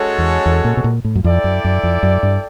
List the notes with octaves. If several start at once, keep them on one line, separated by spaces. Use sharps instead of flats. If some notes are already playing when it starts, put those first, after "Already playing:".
Already playing: G#3 C#4 F#4 A4 C#5
E2
E2
A#2
B2
A#2
A2
F#2
F2 E4 A4 D5 G5
F#2
F#2
F2
F#2
G2